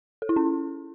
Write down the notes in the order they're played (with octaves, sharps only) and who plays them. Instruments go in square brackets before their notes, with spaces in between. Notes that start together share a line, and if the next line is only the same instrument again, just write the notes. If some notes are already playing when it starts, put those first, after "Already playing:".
[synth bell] A4
E4
C#4